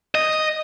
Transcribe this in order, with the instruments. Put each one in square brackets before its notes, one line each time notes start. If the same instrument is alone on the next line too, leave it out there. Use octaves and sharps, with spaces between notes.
[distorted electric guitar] D#5